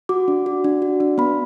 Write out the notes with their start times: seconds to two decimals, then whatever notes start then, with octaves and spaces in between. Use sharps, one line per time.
0.09 F#4 D6
0.28 D4
0.46 F#4
0.64 D4
0.82 F#4
1.00 D4
1.18 B3 B5